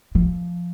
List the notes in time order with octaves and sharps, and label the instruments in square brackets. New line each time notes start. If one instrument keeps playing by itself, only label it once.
[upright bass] F3